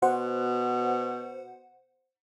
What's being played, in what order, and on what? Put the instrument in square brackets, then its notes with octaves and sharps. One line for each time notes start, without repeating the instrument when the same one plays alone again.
[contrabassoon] B2 [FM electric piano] C5 F#5